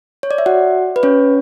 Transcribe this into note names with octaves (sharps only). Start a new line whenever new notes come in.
C#5
D5
E5
F#4 F#5
B4
C#4 C#5